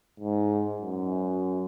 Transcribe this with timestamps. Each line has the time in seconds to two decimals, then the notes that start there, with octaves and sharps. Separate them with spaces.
0.20 G#2
0.81 F#2